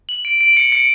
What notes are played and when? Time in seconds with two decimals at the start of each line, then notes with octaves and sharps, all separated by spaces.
0.09 F#7
0.25 D7
0.41 D7
0.57 C#7
0.72 C#7